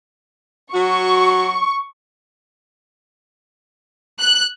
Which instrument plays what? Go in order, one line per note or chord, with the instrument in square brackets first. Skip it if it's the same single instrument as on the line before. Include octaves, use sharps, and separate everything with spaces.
[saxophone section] F#3 F#4 [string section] C#6
[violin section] F#6